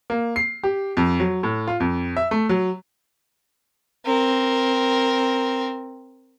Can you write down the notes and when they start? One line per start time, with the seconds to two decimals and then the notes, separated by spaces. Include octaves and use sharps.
0.10 A#3
0.36 C7
0.63 G4
0.97 F2
1.20 F#3
1.43 A2
1.67 F4
1.80 F2
2.17 E5
2.31 A3
2.49 F#3
4.06 C4 A#4